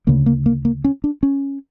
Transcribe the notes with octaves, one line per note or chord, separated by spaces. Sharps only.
D2 C#3 A#3
A#3
A#3
A#3
C#4
D4
C#4